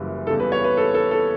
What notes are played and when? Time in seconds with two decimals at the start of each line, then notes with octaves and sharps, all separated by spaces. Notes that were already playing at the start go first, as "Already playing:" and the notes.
Already playing: F#1 F#2 E3 G3
0.27 E2 C#3 G3 A4
0.40 B4
0.52 C#5
0.64 B4
0.77 A4
0.94 A4
1.11 A4